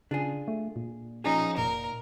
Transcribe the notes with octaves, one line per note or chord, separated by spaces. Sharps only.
C#3 D4 F4 G#4
A3
A#2
F3 C#4 D#4 G#4
F1 A#2 A#4